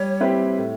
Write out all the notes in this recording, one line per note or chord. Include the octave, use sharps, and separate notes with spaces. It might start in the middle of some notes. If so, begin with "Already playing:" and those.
Already playing: G3 C#5
C4 E4 G4 B4
A2